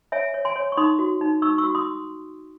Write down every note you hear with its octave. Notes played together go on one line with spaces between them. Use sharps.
C#5 E5 G#5
C#5
G#5 C6
C#5
C#6
D#4 C6 D#6
F#4
D#4
D#4 C#6 E6
C#6 E6
F#4
C6 D#6